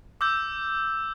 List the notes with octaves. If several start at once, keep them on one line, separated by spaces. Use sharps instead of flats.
D6 E6 G6